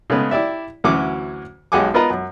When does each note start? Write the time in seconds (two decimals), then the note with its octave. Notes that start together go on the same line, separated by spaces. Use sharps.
0.10 C#3 G#3 A3 B3
0.31 E4 G4 D5 E5
0.84 D2 E3 F#3 C#4 F#5 D6
1.72 B1 G#3 G4 F#5 G#5 D6
1.94 B3 F4 A#4 B4 D#5 A#5
2.10 F#2